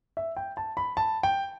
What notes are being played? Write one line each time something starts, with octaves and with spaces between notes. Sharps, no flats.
E5
G5
A5
B5
A5
G5